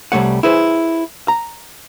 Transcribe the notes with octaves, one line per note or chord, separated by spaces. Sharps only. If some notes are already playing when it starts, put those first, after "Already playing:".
C2 G2 G3 A3 C#5 F#5
E4 G#4 B4 C5
A#5